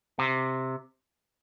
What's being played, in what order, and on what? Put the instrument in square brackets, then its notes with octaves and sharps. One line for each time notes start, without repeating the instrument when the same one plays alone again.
[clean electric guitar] C3